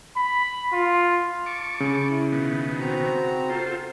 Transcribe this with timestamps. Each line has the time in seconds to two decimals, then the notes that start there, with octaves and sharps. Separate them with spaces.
0.17 B5
0.73 F4
1.46 A5 C#6 D6
1.80 C#3
2.10 E4
2.32 B2 D#3 B3
2.79 C4 F#4 A#5
3.50 F4 A4 C5